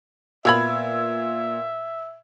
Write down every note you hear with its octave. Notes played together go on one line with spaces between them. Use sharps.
A#2 B3 F4 E5 B5 E6 G#6